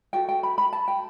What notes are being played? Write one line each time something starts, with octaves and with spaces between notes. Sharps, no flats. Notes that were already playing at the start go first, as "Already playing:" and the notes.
F#4 A4 G5
G5
B5
B5
A5
G5